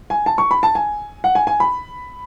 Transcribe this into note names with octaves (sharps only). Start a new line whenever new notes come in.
G#5
A5
C#6
B5
A5
G#5
F#5
G#5
G#5
B5